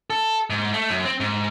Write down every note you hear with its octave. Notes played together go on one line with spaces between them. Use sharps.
A4
G#2
A3
F#2
C4
G#2